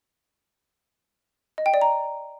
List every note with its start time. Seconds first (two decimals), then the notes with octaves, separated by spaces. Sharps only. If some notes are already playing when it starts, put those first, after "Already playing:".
1.58 D#5
1.66 G5
1.74 D5
1.81 A#5